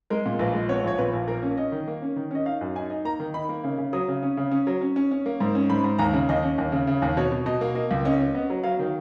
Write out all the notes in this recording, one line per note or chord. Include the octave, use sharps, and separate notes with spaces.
G#3 A#4
A#2
A#1 B4
G#3
B3 C#5
A#1 C#5
A#2 B4
A#1
A#3 A#4
C#4
C#4 D#5
D#3
A#3
C#4
D#3
C#4 D#5
D#4 F5
F#2
D#4 G#5
D#4
A#3 A#5
D#3
D#4 B5
A#3
C#3
C#3
F#3 D#6
C#3
C#4
C#3
C#4
F#3
C#4
C#4
C#4
A#3
G#2
C#4
G#2 B5
G#2
D#2 A#5
C#3
D#2 D#5
C#4
D#2
C#3
C#3
D#2
B2 C#5
B2
B2 D#5
A#3
A#3 D#5
C#2
C#4 D#5
C#4
B3 D#5
F#3
F#3 F5
D#3 F5